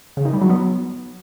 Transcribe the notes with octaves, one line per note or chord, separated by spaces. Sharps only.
C#3
D#3
G3
F#3
B3